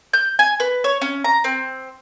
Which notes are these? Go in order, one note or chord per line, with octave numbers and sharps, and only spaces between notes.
G6
G#5
B4
C#5
C#4
A#5
C4